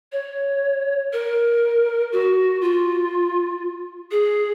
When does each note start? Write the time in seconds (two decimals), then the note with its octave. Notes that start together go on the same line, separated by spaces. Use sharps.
0.12 C#5
1.13 A#4
2.12 F#4
2.61 F4
4.11 G#4